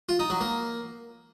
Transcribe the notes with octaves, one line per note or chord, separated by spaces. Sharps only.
F4
D#4
F#3
A#3